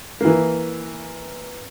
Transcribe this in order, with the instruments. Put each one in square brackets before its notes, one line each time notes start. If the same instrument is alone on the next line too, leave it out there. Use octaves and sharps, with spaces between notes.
[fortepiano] E3 A#3